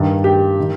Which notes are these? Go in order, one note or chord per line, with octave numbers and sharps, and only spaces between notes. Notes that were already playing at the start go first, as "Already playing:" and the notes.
Already playing: G2 D#3
G4
D#3